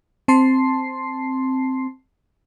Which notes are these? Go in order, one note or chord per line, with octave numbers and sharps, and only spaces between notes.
C4 A5 C6 C7